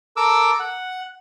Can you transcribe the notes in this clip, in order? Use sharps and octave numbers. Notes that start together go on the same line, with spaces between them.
A4 A#4 D6 E6
F#5